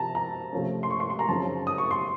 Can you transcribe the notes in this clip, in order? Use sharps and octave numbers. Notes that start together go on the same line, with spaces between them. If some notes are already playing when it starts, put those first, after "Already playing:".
Already playing: C3 F3 C4 A5 A#5
A#5
C3 F3 A3 C#4
C6
C#6
C6
C6
A#5
F#2 C#3 F3 C4 D#4 A5
D#6
C#6
C6